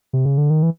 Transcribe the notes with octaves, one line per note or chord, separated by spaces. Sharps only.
C3
C#3
D3
D#3
E3